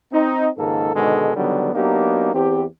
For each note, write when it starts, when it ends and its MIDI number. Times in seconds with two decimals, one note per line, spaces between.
0.12 0.48 60
0.12 0.48 63
0.58 0.93 37
0.58 0.93 44
0.58 0.93 51
0.58 0.93 58
0.58 0.93 69
0.94 1.32 44
0.94 1.32 47
0.94 1.32 50
0.94 1.32 51
0.94 1.32 56
0.94 1.32 69
1.36 1.70 34
1.36 1.70 50
1.36 1.70 51
1.36 1.70 54
1.36 1.70 55
1.36 1.70 59
1.74 2.33 54
1.74 2.33 58
1.74 2.33 59
1.74 2.33 62
1.74 2.33 63
1.74 2.33 67
2.34 2.64 40
2.34 2.64 60
2.34 2.64 67